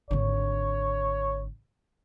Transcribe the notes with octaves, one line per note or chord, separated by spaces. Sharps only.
G#1 D3 C#5